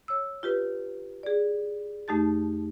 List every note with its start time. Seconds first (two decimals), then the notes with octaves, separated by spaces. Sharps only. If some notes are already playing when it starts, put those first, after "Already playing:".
0.08 C#5 E6
0.43 F4 G4 B4
1.23 G#4 D5
2.08 F2 A3 D#4 G4 A5 A6